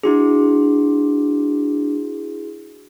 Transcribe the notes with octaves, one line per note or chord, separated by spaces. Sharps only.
D4 E4 F#4 G#4